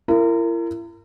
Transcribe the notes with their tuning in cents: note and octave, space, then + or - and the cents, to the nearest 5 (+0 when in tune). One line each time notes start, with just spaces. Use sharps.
E4 +40 A#4 -25